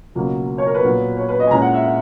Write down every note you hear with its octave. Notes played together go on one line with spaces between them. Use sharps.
C#2 B2 F#3 A#3
C#5
A#4
B4
A#2 F#3 B3
C#5
B4
D#5
G#5
A#2 G#3 C#4 E4 A#5
F#5
E5
F#5